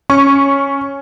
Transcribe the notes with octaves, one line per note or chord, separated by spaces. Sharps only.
C#4 C#6